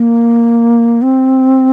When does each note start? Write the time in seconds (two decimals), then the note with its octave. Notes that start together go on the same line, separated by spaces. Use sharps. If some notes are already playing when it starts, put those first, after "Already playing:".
Already playing: A#3
1.02 C4